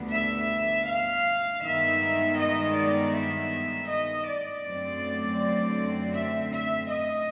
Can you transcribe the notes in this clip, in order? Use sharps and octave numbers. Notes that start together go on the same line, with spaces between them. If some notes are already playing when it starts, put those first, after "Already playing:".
Already playing: D2 D3 G3 B3 D4
E5
F5
G2 D#3 G#3 B3 E5
D#5
D5
E5
D#5
D5
F#2 D3 F#3 A3 C4
E5
E5
D#5